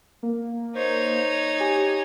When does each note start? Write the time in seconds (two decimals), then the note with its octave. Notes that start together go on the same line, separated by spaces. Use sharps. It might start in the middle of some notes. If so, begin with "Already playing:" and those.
0.23 A#3
0.76 D#4 C5 C#5
1.60 G4 G#5